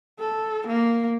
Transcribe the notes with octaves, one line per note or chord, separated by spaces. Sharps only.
A4
A#3